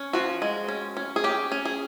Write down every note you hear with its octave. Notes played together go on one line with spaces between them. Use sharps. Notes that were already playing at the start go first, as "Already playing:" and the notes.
Already playing: C#4
F3 F#4
G#3
C#4
C#4
G#4
C#4 G4
C#4
G#4